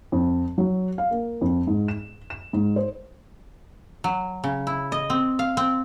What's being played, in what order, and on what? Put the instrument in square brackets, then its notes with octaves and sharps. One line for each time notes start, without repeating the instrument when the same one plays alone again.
[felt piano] F2
F#3
F5
A#3
F2
G#2
E7
E7
G#2
C5
[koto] F#3
C#3
E4
D#5
C4
F5
C4